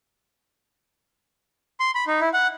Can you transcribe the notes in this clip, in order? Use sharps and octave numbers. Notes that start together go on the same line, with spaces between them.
C6
B5
D#4
E4
F#5